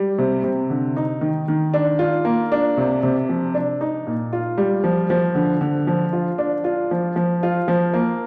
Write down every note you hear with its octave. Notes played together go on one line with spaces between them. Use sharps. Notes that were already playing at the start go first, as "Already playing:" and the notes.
Already playing: G3
C3
C3
D3
D#4
D#3
D#3
D4
F4
A#3
D4
C3
C3
F3
D4
D#4
A#2
F4
G3
F3
F3
D3
D3
F3
F4
D4
F4
F3
F3
F4
F3
A#3